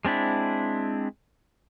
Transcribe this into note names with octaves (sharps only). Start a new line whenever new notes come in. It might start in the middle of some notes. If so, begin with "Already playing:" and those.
G#3 C4 D4 E4